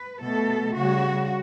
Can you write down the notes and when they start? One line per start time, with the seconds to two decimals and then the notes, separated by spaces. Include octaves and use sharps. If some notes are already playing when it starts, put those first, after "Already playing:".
Already playing: B4
0.23 B2 A3 A4
0.76 C#3 G3 F#4